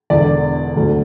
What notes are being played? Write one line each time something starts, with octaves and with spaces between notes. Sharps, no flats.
E1 E2 D3 D5
D2 D3 F#3